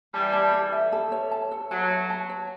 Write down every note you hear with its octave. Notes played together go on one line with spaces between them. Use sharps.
E3 G3 A5
A5
A4
E5
A4
C#5
A5
A4
F#3 A5
E5
A5
C#5